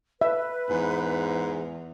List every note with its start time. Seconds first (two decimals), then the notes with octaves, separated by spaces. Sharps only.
0.21 B4 E5
0.69 E2 G#2